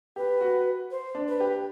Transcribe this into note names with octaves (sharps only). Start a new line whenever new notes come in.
G4 B4
F#4
C5
D4
B4
G4